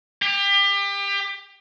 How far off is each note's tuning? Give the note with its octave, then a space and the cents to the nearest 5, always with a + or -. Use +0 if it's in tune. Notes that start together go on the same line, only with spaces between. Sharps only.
G4 +30